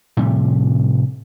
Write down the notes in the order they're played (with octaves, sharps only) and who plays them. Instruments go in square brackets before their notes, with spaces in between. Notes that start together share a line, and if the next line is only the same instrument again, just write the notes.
[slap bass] A2 C3 F3 G3